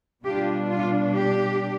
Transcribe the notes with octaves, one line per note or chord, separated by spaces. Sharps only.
B2 G3 D4 F4 G4
F4
G4